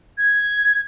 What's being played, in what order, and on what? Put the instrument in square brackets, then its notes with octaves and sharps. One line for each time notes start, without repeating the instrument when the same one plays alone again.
[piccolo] G#6